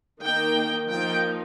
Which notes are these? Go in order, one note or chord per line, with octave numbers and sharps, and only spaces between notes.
D#3 A#3 D#4 G5
F3 A#3 D#4 G5